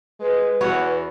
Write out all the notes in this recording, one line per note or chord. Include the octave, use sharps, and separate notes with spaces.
G#3 B4
E2 B3 F#4 C#5